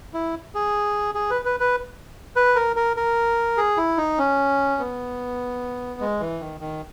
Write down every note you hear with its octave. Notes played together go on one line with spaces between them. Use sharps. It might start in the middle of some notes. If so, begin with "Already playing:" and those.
E4
G#4
G#4
B4
B4
B4
B4
A#4
A#4
A#4
G#4
E4
D#4
C#4
B3
G#3
E3
D#3
D#3